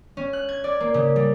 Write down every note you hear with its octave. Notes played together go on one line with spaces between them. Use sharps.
C#4
F#6
G#6
D5
A#3
C#3
G3